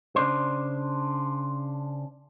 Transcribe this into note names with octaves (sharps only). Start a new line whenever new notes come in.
C#3 D4 C5